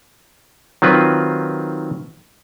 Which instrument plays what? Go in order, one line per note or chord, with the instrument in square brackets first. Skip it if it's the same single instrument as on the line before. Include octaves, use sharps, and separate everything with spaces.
[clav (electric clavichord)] D#3 F#3 C4 F4 B4